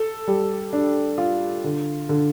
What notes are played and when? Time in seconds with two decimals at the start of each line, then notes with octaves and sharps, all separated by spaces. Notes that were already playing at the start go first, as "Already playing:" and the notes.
Already playing: A4
0.28 G3
0.73 D4
1.18 F4
1.64 D3
2.09 D3